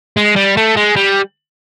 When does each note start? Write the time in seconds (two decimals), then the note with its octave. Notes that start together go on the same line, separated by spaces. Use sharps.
0.17 G#3
0.36 G3
0.57 A3
0.76 G#3
0.96 G3